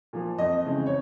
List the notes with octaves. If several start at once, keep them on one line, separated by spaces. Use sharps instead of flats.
A#2 F3
F2 D#5
C#3 E3 G#3 C4
C#5